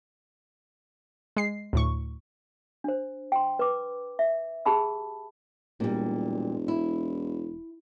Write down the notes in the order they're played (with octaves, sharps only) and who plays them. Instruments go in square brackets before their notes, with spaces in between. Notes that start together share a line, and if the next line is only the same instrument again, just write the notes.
[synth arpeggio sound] G#3 C7
D2 A2 C#6
[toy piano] D4 C5
G5 C6
B4 D6
E5
G4 G#4 A5 B5 E6
[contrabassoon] E1 [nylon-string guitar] A#2 G3
[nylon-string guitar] E4